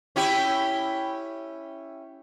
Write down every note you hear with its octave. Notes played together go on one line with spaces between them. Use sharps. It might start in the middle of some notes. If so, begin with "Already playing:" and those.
C#4 E4 G4